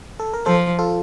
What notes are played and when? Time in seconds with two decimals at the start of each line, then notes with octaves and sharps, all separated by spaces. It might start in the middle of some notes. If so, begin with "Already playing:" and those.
0.19 A4
0.33 A#4
0.46 F3 A4 C5
0.79 F4 A4